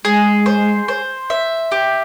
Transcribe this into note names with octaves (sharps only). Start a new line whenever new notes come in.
G#3 G#4
C5
C5
E5
G4